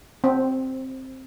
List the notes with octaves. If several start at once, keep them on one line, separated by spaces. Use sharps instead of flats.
C4